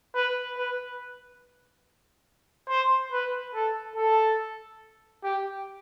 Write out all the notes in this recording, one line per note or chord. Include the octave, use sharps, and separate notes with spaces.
B4
B4
C5
B4
A4
A4
G4